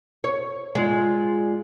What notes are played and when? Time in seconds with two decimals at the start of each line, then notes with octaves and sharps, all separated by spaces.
0.24 C#5
0.75 G#3 F4 D5